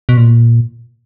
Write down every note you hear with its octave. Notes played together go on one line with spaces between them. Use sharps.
B2
A#2